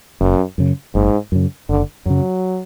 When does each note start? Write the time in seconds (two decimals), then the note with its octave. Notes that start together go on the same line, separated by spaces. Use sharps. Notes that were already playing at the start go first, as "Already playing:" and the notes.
0.20 F#1 F#2
0.58 F#2 C#3
0.95 F#1 G#2
1.32 F#2 C#3
1.69 F#1 D3
2.06 F#2 C#3 F#3